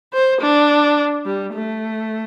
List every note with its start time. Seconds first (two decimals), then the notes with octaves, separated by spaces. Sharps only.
0.13 C5
0.41 D4
1.26 G3
1.54 A3